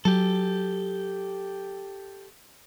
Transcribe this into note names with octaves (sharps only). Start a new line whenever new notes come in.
F#3 G4 A4